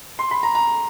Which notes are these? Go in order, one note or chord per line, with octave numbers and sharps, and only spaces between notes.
C6
B5
A#5
A#5